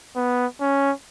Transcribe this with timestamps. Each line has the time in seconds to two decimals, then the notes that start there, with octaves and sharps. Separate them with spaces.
0.16 B3
0.61 C#4